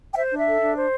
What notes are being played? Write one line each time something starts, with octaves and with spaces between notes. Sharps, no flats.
G5
C5 E5
D4
E5
A4
D4
C5